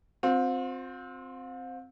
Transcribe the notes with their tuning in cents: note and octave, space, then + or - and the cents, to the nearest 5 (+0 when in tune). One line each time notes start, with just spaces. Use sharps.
C4 +0 F4 +40